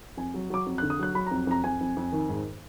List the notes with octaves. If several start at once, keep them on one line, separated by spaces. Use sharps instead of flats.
F2 G#5
F#3
F#3 D6
F2
F#6
D3
D#6
F#3 F#6
F#3 B5
A#5
F2
F2 A#5
F2 G#5
F2
F2
D#3
G#2